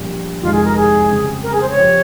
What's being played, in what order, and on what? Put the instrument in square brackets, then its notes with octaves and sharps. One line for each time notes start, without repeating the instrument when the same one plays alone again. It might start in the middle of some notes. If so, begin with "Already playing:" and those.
Already playing: [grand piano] A#1 A#2 G3
[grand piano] F2 C3 D#3 G#3 D#4 [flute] F4
[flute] G#4
A#4
G#4
[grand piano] C#3 G3 C4 G4
[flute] A#4
G#4
C5
C#5
[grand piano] F3 C4 G4 C5